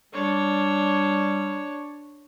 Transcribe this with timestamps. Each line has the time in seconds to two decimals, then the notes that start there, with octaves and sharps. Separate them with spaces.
0.13 G3 D4 C#5